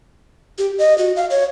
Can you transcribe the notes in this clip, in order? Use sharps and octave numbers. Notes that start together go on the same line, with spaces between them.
G4
D#5
F#4
F5
C#5